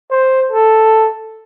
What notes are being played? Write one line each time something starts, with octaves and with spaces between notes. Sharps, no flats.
C5
A4